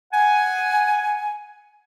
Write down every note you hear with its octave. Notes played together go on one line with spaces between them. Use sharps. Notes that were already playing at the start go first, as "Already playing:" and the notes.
F#5 G#5